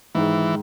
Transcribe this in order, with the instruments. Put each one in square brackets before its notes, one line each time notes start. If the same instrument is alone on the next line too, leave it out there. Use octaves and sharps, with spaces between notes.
[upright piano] G#2 D#3 G#3 [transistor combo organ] E3